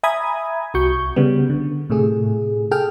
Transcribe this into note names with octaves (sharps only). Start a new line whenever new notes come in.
E5 G#5 A#5 B5 D#6 G#6
C2 C3 F#4 C#6 G6
C#3 G3 B3
D3
A2 C3 A3 G#4
G#4 A4 G5 F6